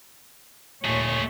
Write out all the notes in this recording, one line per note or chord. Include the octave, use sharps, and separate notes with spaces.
D#2 A#2 A3 G#4 C#5